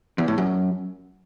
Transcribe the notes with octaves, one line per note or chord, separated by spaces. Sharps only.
E2
A2
F#2